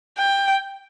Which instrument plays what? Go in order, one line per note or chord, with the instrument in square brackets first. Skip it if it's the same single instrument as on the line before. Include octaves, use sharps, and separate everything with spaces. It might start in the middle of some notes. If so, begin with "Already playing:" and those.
[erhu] G5